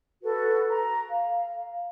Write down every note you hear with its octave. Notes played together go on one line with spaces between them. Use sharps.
F#4 A4 B4
A#5
F5